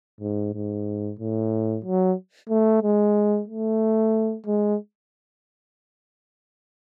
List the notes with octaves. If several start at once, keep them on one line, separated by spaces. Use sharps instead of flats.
G#2
G#2
A2
F#3
A3
G#3
A3
G#3